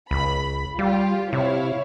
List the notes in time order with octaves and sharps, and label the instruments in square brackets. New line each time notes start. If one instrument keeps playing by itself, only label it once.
[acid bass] C#2 [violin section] B5
[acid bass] G3 [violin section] F4 G4
[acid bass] C3 [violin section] E4 C#5 F5